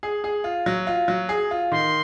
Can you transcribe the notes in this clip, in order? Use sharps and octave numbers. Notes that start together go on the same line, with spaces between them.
G#4
G#4
F4
F#3
F4
F#3
G#4
F4
D#3 C6